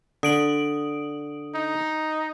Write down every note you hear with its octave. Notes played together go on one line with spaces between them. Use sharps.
D3 D#6 D7 F#7
D#4